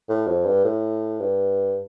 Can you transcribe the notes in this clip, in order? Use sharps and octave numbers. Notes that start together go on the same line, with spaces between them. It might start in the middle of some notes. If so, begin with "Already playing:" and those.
A2
F2
G2
A2
G2